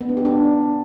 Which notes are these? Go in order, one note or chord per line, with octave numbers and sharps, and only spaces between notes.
B3
D4
G4
D4